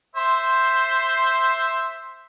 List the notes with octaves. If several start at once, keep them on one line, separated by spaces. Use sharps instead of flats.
C5 E5 C6